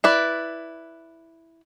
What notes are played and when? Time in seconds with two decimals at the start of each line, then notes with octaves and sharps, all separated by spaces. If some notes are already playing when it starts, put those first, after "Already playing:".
0.04 E4 B4 D5